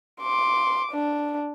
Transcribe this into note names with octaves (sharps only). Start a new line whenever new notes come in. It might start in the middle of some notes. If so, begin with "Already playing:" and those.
C6 D6
D4